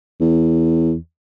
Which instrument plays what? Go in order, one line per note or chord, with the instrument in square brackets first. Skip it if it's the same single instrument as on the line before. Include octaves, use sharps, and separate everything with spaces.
[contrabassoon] E2